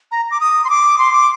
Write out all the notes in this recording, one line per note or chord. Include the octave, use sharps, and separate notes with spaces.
A#5
D6
D#6
C6
D6
C6
D6